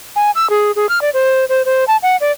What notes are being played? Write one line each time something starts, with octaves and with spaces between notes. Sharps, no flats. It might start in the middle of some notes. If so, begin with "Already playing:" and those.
G#5
E6
G#4
G#4
F6
D5
C5
C5
C5
A5
F#5
D5